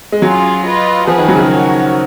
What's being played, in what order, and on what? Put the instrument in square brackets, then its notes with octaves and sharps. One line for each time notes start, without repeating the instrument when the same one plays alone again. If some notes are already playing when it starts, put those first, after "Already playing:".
[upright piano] G#3
[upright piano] F#3 [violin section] C#4 F4 G#4
[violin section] F4 B4 D#5
[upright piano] F3 [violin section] G#4 B4 F#5
[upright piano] D#3
F#3
C#3
D#3
[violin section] F#4 A#4 C#5 G#5